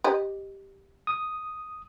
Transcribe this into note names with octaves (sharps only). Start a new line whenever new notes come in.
G4 D#5
D#6